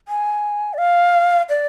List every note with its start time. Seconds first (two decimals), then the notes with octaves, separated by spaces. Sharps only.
0.08 G#5
0.74 D5
0.79 F5
1.49 D5